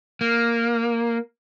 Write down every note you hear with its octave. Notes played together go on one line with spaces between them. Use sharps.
A#3